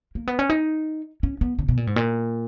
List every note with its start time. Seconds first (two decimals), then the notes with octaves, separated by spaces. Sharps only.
0.15 A#3
0.28 B3
0.39 C#4
0.50 D#4
1.23 C#4
1.41 B3
1.59 C#3
1.68 B2
1.77 A#2
1.87 G#2
1.96 A#2